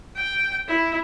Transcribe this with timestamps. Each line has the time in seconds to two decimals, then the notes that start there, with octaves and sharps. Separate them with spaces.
0.16 G5
0.68 E4